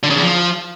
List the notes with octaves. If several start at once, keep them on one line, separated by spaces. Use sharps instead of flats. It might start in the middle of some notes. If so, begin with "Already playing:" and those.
D3
C#3
E2
F3